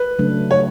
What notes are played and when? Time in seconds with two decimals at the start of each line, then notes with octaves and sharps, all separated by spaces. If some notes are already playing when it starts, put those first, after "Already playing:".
Already playing: B4
0.19 C#3 F#3 A3 D4
0.51 C#5